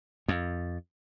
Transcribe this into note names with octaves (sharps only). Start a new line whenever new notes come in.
F2